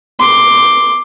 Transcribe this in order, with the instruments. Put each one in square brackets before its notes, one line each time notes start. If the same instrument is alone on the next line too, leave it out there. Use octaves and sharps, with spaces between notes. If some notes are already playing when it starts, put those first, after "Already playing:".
[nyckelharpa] C6 D6